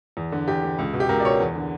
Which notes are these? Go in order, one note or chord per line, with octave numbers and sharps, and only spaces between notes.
E2
D3
E2 G4
D3
C#2
B2
G4
C#2 A#4
D5
B2 C#5
E2
D3